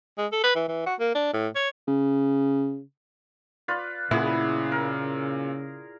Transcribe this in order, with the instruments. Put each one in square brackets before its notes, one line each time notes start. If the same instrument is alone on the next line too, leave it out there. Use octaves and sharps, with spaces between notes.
[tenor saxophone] G#3
A4
B4
E3
E3
F#4
A#3
D4
A2
C#5
[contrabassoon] C#3
[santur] F4 B4 D5
[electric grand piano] A#2 [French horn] C#3 [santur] B3 G#4 B4 [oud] E4
[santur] A#4